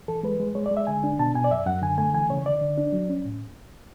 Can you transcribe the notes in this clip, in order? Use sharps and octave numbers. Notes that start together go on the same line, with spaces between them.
E3 A4
G#3 B4
G#3
G#3 C#5
D5
G#3
E5
D3 G#5
D4
B2 A5
B2 G#5
D5
F#2 E5
F#2 F#5
D3 G#5
A3 G#5
E3 G#5
C#3 C#5
D3 D5
D3
D4
F#3
C#4
A2